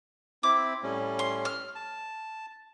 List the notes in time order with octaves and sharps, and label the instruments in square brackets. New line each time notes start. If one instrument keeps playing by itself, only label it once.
[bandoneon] C4 E4 [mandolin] D6
[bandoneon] A2 G3 C#4
[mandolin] C6
F6
[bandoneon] A5